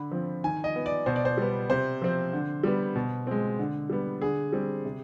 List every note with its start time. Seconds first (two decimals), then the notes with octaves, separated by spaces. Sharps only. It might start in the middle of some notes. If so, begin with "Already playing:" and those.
Already playing: D3 B5
0.11 F3 C4
0.44 D#3 G#5
0.64 D#5
0.76 B3
0.86 D5
1.06 B2 C5
1.16 D5
1.25 C5
1.37 G3 B3
1.70 C3 C5
2.02 F3 C4
2.33 D3
2.64 G3 B3
2.95 B2
3.27 G#3 C4
3.59 D3
3.90 G3 B3
4.22 D3 G#4
4.53 G3 C4
4.85 C3